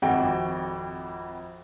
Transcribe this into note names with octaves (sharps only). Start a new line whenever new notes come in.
G#1 F2 F#4 G5